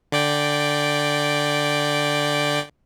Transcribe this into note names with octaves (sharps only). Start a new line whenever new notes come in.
D3 D5 G5